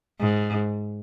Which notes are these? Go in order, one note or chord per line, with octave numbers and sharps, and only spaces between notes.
G#2